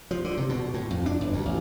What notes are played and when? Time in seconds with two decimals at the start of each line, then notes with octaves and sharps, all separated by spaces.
0.11 F3
0.24 D3
0.37 C3
0.49 B2
0.74 A2
0.91 F2
1.06 D4
1.21 G1
1.33 D2
1.46 A1